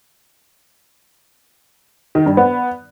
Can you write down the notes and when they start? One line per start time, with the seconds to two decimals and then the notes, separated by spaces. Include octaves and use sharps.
2.15 D#3
2.26 G2
2.37 B3